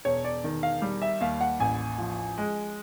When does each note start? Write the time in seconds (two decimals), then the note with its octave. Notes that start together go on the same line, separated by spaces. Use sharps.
0.05 E1 C#5
0.24 D5
0.44 D#3
0.63 F5
0.82 G3
1.02 E5
1.21 D#2 F5
1.41 F#5
1.60 A1 G#5
1.98 F3
2.38 G#3